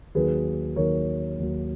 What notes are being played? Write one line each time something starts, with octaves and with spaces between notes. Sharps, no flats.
D#2 D#3 F#3 G#4 B4
D#2 D#3 F#3 A#4 C#5
D#2 D#3 F#3